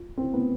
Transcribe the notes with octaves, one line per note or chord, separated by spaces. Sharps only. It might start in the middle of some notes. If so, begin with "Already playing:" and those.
Already playing: F4
C4
B3